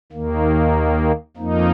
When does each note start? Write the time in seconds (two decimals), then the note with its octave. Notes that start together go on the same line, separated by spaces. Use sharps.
0.12 D#2 D#3 A#3
1.37 F2 F3 A#3 D#4